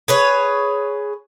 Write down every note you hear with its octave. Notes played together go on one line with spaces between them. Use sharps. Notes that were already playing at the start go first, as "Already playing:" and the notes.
G#4 B4 C#5